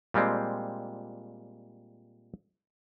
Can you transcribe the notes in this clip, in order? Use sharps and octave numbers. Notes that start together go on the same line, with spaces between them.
A#2 G3 G#3 C4